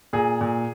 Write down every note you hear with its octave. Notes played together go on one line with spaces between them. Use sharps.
A#2 G#4
A#2